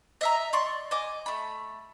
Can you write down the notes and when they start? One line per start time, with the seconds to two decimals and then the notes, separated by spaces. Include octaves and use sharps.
0.21 D#5 E5 A#5
0.53 D5 C6 C#6
0.91 D#5 G#5 D6
1.26 A3 B5